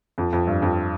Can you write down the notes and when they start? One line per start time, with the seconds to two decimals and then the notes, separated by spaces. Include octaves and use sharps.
0.18 F2
0.33 F2
0.47 G2
0.62 F2